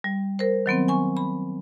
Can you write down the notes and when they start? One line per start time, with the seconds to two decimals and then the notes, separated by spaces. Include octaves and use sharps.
0.04 G3
0.39 A#4 C5
0.66 D#3 F#3 B3 C4
0.88 G#5 C#6
1.17 B5